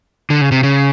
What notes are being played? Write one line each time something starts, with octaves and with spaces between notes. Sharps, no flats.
D3
C#3
C3
C#3